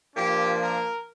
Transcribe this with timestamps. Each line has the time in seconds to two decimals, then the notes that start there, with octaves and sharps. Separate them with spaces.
0.15 A#2 F3 A#3 D4 G4
0.59 A#4